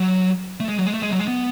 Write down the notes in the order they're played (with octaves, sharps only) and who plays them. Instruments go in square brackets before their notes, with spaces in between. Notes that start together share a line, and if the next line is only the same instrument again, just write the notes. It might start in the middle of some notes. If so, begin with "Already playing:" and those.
Already playing: [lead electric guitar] F#3
A3
G#3
F#3
G#3
A3
G#3
F#3
G#3
B3